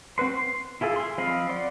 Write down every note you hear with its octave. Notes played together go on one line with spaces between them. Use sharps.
C4 F#4 B4 C6
C6
E4 F4 G#4 A4
G#4 C6
F3 C4 D#5 F5 B5
D5 F#5 C6